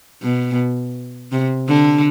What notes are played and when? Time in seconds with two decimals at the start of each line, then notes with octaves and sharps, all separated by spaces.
0.22 B2
1.32 C3
1.68 D3